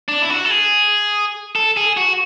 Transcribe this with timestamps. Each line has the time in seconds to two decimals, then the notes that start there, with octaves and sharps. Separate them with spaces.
0.08 D4
0.22 E4
0.30 F#4
0.45 A4
0.50 G#4
1.56 A4
1.77 G#4
1.97 F#4